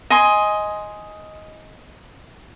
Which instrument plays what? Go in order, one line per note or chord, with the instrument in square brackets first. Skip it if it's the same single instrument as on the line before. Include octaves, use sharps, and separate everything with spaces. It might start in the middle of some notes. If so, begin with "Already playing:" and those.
[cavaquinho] D#5 G#5 C6